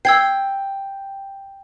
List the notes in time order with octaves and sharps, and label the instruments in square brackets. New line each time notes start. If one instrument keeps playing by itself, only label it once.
[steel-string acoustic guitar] G5 [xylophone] E6 G#6 C7